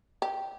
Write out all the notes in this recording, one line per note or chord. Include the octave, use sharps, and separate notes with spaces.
G4